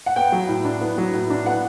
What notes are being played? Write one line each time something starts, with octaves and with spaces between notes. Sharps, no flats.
F#5
B3 G5
F#3
A2
D4
B3
F#3
A2
D4
B3 F#5